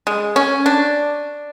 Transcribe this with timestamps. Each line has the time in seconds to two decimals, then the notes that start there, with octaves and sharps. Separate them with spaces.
0.07 G#3
0.36 C#4
0.66 D4